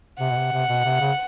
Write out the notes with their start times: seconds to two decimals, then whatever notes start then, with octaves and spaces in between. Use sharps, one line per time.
0.20 C3 F#5
0.31 B2
0.36 C3
0.52 C3
0.69 B2
0.84 C3
1.00 C#3